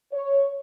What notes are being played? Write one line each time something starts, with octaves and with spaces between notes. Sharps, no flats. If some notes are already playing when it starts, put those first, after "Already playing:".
C#5